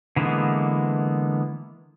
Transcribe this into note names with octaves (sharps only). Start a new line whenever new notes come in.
D3 E3 G#3 A#3 B3